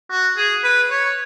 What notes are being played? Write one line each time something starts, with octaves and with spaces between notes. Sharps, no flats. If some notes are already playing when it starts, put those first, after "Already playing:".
F#4
G#4
B4
C#5